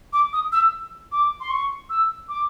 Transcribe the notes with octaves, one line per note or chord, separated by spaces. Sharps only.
D6
D#6
E6
D6
C6
C#6
E6
D6